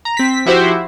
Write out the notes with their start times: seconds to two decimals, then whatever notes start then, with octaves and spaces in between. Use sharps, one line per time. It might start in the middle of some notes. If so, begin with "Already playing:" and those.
0.05 A#5
0.17 C4 B6
0.46 F3 E4 F#4 G4 C5 E5